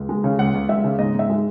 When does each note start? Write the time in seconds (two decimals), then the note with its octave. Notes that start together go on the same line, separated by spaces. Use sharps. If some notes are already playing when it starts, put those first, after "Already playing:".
Already playing: C#2
0.09 G#3
0.24 C#3
0.39 C#2 F#5
0.54 C#2
0.69 G#3 E5
0.84 C#3
0.99 G#2 D#5
1.14 G#2 E5
1.30 G#3